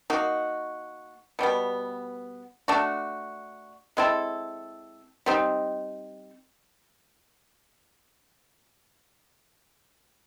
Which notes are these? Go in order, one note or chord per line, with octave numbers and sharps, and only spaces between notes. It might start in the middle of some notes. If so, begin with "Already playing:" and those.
A#3 D#4 F#4
B2 G3 B3
A3 D4 F#4
G#3 C4 E4 A4
G3 C4 D#4